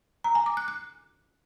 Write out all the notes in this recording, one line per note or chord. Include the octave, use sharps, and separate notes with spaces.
A#5
G#5
D6
F#6
F#6